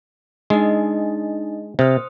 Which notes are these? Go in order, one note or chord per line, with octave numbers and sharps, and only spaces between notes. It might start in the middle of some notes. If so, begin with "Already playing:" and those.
G#3 D4 D#4 D#5
C3 C5 D#6 F6